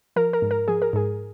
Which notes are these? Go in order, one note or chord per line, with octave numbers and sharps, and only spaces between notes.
F3 A#4
A#4
G#2
A#4
F3 G#4
A#4
G#2 G#4